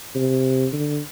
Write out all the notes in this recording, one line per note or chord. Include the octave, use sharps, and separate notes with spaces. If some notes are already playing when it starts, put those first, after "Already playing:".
C3
D3